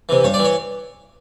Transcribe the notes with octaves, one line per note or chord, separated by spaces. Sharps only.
C3 E3
G2 C#5
D5
E3
C#5